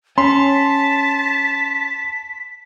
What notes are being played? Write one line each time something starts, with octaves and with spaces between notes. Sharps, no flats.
C#4 A5 C6 B6